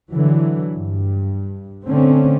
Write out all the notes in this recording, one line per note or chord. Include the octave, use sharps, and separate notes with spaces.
D3 E3 F#3
G2
D3 A3 C4 C#4